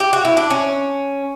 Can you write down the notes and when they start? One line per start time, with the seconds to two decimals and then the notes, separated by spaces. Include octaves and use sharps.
0.00 G4
0.13 F#4
0.25 E4
0.37 D4
0.50 C#4